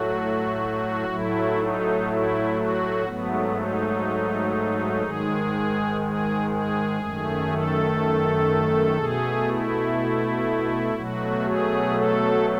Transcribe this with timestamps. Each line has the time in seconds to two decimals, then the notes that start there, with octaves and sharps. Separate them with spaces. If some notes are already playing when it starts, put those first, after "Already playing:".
Already playing: A2 F#3 A3 F#4
1.08 A2 F#3 A3 E4
1.57 D#4
2.06 E4
2.56 F#4
3.05 G#2 F#3 A3 B3
3.55 D#4
5.02 G#2 D#3 G#3 G#4
6.01 G#4
6.51 G#4
6.99 F#2 D#3 A3
7.50 A4
8.97 B2 A3 G#4
9.47 E4
10.94 B2 F#3 A3 F#4
11.44 G#4
11.94 A4